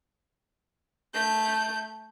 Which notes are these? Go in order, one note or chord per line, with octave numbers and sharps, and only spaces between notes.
A3 G6